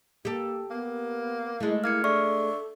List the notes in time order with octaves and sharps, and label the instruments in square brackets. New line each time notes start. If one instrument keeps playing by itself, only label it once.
[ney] A#3 [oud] G4 A4
[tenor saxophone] A#3 [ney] B3
[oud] G#3 A3 [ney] E4
[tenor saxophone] A#3 [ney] E4 [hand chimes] F6 G#6 C#7
[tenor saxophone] D4 [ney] A4 [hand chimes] D5 E5 C#6